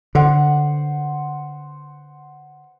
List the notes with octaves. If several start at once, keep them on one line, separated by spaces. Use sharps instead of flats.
D3 C5 F#5